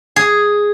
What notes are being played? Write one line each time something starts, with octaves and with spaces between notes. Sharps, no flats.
G#4